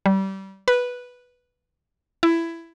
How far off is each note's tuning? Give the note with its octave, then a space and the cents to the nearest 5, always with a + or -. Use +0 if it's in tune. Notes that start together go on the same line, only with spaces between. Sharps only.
G3 -25
B4 -5
E4 +15